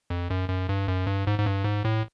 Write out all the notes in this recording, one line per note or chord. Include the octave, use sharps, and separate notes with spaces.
F2
F#2
F#2
G2
F#2
G2
G#2
G#2
G2
G#2
A2